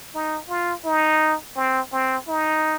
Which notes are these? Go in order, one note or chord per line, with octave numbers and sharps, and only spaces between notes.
D#4
F4
D#4
C4
C4
D#4